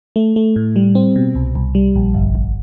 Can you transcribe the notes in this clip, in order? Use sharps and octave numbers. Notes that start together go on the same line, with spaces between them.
A3
A3
A2
G3
C4
B2
C2
C2
G3
A#1
G1
G1